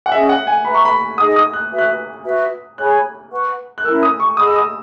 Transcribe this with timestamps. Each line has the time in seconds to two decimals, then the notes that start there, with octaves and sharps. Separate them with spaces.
0.06 F#5
0.11 C#4 G#4 D#5 E5 G#5
0.29 F#5
0.47 G#5
0.64 B4 E5 A#5 B5
0.74 C#6
0.85 B5
1.18 D#4 G#4 D#5 F#5 D#6
1.36 D#6
1.53 F#6
1.71 F#4 B4 E5
1.78 F#6
2.24 F#4 B4 E5
2.78 G#4 C#5 G#5 B5 F#6
3.31 B4 F#5 C#6
3.78 F#6
3.85 C#4 E4 A#4 E6
4.03 D#6
4.20 C#6
4.37 G#4 D#5 F#5 B5 D#6
4.47 E6
4.56 D#6